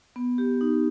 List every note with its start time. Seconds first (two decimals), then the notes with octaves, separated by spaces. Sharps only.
0.16 B3
0.38 G4
0.61 D#4